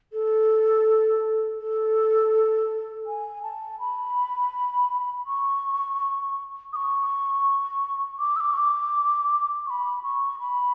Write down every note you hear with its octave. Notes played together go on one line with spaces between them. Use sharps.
A4
A4
G#5
A5
B5
C#6
D#6
C#6
D6
E6
D6
C#6
D6
C#6
B5
C#6
B5